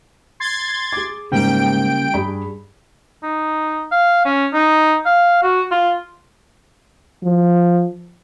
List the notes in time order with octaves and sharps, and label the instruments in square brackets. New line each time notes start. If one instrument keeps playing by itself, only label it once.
[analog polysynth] C6 G#6 A6
[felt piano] G#4 D6
[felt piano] G#2 [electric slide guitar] C#3 G3 A#3 [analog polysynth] G5 D7
[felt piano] G2 G#4 B5
[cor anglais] D#4
F5
C#4
D#4
F5
F#4
F4
[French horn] F3